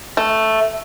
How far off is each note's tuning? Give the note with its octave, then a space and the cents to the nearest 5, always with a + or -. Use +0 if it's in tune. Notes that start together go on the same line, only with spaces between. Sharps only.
A3 +0